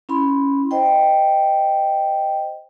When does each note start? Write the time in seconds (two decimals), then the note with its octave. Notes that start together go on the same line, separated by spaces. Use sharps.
0.09 C#4 E4 B5 C6
0.71 C5 D#5 G5